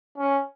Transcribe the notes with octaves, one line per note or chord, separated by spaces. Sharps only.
C#4